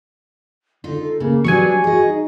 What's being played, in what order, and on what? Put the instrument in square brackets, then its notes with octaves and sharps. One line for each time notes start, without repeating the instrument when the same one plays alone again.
[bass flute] D3 [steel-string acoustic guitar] D#4 F4
[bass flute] A4
[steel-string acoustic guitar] C#3 [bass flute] A#3
[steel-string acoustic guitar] F#3 B3 D4 [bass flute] G4 [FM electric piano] G#5 C#6
[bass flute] F#4 [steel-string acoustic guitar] G#4 D#5
[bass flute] D#4